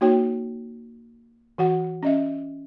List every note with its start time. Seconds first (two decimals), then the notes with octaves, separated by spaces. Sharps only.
0.01 A#3 D#4 F#4 C#5 G5
1.58 E3 F#4 F#5
2.03 C#4 D#5 E5